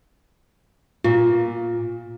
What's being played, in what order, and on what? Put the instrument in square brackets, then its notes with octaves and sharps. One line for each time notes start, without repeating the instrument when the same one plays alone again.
[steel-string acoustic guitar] A#2 [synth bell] F4